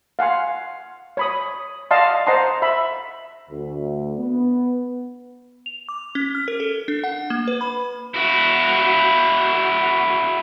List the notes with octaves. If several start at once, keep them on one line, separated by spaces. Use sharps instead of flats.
F5 F#5 G#5 C6
C#5 B5 D#6
D5 D#5 F5 F#5 A5 C6
C5 D#5 F#5 A5 A#5 C6
E5 B5
D2
B3
F7
D6
C#4
F6
A#4
A4
D4
F#5
A#3
B4
B5
E4 F#4